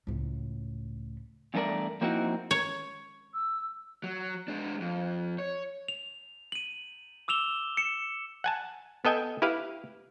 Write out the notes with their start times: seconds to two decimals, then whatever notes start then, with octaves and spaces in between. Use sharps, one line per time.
0.07 C#2 A2
1.54 E2 G2 A3 C4 A#4 D5
2.01 F3 A#3 C4 D#4 E4 F#4
2.51 C#5
3.33 E6
4.04 F#3
4.48 G#3 D4
4.80 F2
5.39 C#5
5.88 F7
6.52 D#7 F#7
7.28 D6 E6 E7 F7 G7
7.77 C#7 E7
8.44 F#5 G#5 A5
9.05 B3 A4 D#5 G5 G#5
9.42 E4 G4 B4 F5